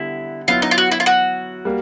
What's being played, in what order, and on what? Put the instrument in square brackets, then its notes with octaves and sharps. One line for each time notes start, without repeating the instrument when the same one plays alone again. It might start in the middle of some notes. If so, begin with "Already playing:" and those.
Already playing: [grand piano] D3 G3 B3 [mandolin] E4
[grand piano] F#3 B3 E4 [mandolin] F4
[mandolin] D#4
F4
F#4
E4
F4
F#4
[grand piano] G3 A#3